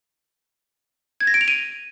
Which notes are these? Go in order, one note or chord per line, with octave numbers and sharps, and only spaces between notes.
G#6
A#6
D7
F7
D#7